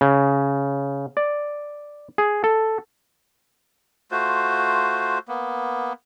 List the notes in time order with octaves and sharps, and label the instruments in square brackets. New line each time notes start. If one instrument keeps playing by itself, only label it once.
[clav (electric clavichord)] C#3
D5
G#4
A4
[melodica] A3 F4 F#4 C5
A#3 B3